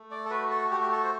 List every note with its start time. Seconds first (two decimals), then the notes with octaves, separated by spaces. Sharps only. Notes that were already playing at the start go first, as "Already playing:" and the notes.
Already playing: A3
0.11 D5
0.25 A4
0.30 F#4 B4
0.50 A4
0.71 A3 G4
0.81 G4
0.92 A4
1.04 C5